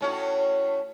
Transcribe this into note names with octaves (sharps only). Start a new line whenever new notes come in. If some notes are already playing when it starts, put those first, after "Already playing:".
A2 C#4 F#4